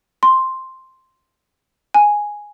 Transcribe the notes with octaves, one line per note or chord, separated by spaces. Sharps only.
C6
G#5